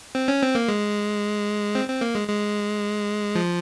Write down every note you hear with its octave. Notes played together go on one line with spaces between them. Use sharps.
C4
C#4
C4
A#3
G#3
C4
C4
A#3
G#3
G#3
F3